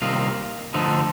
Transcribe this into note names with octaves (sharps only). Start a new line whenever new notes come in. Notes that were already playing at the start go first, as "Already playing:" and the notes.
C2 C3 D#3 A#3 F4
D3 F3 A3 D#4